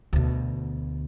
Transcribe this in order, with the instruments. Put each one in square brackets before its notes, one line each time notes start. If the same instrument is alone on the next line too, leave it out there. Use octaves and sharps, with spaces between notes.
[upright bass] D2 B2